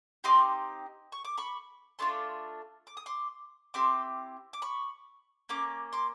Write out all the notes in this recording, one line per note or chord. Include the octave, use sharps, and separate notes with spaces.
C4 D#4 G4 C6 D6
C#6
D6
B5 C#6
A3 D4 F4 C6 D6
D6
D#6
C6 D6
C4 E4 G4 C6 D6
D6
B5 C#6
A#3 C#4 D6
C6 D6